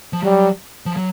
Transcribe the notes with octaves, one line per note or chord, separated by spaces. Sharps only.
F3
F#3 G3
F3
F#3